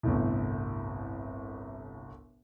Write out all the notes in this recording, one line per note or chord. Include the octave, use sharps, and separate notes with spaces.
G1 C2 A2